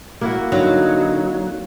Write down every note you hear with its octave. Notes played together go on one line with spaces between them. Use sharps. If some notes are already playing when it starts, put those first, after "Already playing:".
A#3 E4 F#4
D3 F#3 C4 D#4